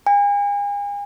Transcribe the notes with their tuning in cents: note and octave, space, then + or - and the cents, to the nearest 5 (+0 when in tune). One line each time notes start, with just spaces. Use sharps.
G#5 -40